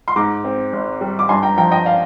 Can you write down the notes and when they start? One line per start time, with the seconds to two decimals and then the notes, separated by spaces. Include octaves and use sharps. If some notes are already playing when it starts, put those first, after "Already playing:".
0.08 C6
0.16 G#2 A#5 D6
0.44 C4
0.73 G#1
1.01 G3
1.19 D6
1.29 G2 G#5 C6
1.43 G5 A#5
1.57 F3 G5 A#5
1.71 D#5 G5
1.86 D5 F5